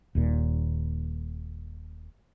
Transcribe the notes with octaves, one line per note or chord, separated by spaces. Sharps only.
D#1 D#2 A#2